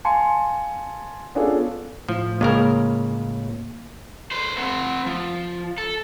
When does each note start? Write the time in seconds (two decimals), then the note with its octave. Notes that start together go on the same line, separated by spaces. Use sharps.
0.05 F5 G#5 A5 C6 C#7
1.35 B3 C#4 D4 F4 G#4 A4
2.09 A2 F3
2.41 C#2 C#3 A#3 A#4
4.32 B4 C5
4.58 C4 F#5
5.06 F3
5.78 A4